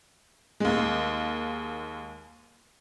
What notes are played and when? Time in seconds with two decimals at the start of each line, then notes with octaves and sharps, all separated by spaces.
0.60 D#2 G#3